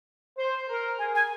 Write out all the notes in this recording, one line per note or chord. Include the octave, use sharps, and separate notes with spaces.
C5
A#4
G#4 G#5
G#5